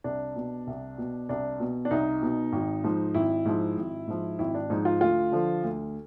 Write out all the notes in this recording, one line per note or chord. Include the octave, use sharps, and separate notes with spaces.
C2 D4
B2
C2
B2
C2 D4
B2
D4
C2 D#4
B2
G#1
G#2 F3
G#1 E4
G#2 F3
G#1
G#2 F3
G#1 E4
D4
G#2 F3 D#4
F4
D2 F4
D3 F3
D2